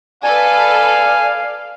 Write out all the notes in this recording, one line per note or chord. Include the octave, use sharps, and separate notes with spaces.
A4 B4 D5 F5 G#5